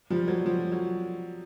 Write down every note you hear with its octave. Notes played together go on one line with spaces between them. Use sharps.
F3 G3
F#3
F3
F#3